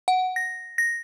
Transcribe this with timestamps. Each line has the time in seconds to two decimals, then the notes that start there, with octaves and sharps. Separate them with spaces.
0.08 F#5
0.36 A#6
0.78 A#6